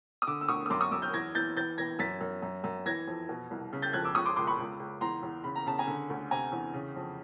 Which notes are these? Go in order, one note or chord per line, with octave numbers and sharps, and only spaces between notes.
D#6
D3 D6 E6
E6
D2 C#6 D#6
D#6
F#2 C6 D6
C#6 D#6
F#2 D6 E6
F6 G6
E2 G#6 A#6
E3 G6 A6
E3 G6 A6
E3 G#6 A#6
F#2 A6 B6
F#2
F#2
F#2
E3 G#6 A#6
F2
B2
C2
C#3
G6 A6
F2 F#6 G#6
D6 E6
C#2 C#6 D#6
C6 D6
C#2 C6 D6
B5 C#6
C#2
C#2
E2 A#5 C6
E2
C#3 B5
A#5
C#3 A5
G#5 A#5
D3
D2
C3 G#5 A#5
E2
C#3
F2